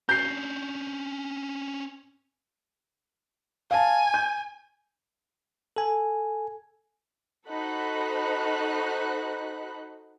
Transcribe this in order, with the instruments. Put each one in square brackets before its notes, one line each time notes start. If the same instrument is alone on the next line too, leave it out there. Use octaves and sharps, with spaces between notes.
[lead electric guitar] C#4 D4 [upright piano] G6 C7
[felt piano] F5 A5 [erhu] G#5
[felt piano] G6
[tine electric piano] A4 G#5
[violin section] D#4 F#4 A4 C5 B5 F#6